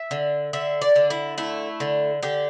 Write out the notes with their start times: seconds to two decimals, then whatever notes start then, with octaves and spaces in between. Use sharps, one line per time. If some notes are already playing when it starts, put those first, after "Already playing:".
Already playing: E5
0.11 D3
0.53 D3 E5
0.82 D5
0.96 D3
1.10 E4
1.38 A3 E4
1.80 D3
2.23 D3 G4